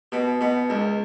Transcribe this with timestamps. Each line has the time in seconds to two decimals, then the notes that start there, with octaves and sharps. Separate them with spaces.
0.12 B2
0.41 B2
0.70 C#2